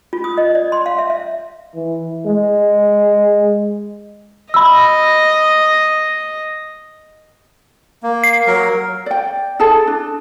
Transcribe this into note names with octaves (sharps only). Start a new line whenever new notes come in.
F4
D#6
D#5
D5
C6
F5
E5
E5
E3
G#3
D#5 B5 E6
A#3
C7
F#3 A#4
D5 G5
E4 G#4 A4 A5
D4